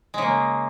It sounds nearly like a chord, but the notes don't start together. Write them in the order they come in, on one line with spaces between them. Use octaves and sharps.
G#3 C#3 A#3